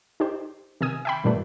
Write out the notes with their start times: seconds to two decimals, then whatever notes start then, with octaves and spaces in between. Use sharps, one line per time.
0.20 D#4 G4 C5
0.81 C3 D#3 G#5 D#6
1.05 E5 G5 B5
1.24 G2 A#2 D#3 G3 A3 B3